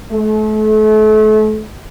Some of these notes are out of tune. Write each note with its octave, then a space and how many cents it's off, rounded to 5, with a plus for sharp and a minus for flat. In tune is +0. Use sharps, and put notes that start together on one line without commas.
A3 -35